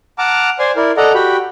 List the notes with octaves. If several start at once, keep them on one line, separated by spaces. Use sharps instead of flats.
F#5 A5 A#5 D6 F6
C5 D5 G#5 C6
E4 A#4 D5
A4 D5 D#5 F#5 A#5
F#4 G4 G5 B5